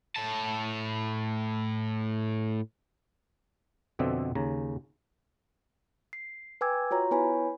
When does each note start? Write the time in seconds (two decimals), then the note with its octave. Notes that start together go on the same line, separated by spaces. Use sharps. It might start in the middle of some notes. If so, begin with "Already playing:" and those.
0.16 A2 A5
3.99 F2 B2 D3 C4 D5 E5
4.35 D#2 C#3 A#5
6.13 C7
6.61 B4 G5 G#5 D6 E6 G#6
6.91 F4 F#4 C#5 A#5
7.11 B3 E4 B4 C#5 G#5 B5